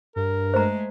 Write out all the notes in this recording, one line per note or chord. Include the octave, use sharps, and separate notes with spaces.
G2 A#4
G#3 A3 C5 A#5